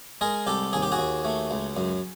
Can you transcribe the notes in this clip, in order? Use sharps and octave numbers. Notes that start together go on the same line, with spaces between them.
G#3 G#4 A#4
C2 G4 A4
D#2 G#4
G4
F#4 G#4
D#2
A3
C#2
F#2